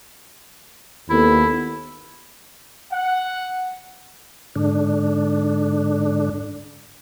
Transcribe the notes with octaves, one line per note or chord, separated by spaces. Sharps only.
D#2 B3 E4 A4
F#5
G#2 D3 D4